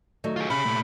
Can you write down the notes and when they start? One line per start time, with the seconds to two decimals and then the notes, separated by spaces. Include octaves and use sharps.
0.24 D#3 F#3 A3
0.36 F4 G#4
0.50 C3 C#4 G#4 B5
0.65 A#2 A3